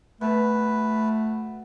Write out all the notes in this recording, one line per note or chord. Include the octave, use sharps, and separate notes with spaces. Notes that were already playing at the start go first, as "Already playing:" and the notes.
B2 A3 B4